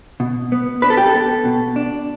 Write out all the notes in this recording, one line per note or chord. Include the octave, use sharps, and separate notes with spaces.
B2
B3
D4 B4
A4
G4
A4
B3
B2
D4